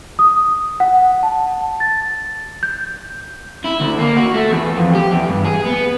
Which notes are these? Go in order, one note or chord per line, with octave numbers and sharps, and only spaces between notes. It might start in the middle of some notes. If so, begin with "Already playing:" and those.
D#6
F#5
A5
A6
G6
E4
D2
A#3
F#4
A3
E2
F2
G4
E2
G2
G#4
B3